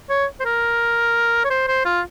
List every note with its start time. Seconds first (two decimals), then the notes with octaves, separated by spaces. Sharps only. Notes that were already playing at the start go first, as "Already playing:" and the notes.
0.10 C#5
0.40 C5
0.45 A#4
1.45 C#5
1.50 C5
1.68 C5
1.85 F4